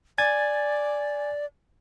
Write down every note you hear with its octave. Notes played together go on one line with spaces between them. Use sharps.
D5 G#5 G#6 A6